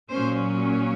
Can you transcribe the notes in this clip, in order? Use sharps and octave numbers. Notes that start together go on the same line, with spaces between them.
A#2 F#3 A#3 C#4 C5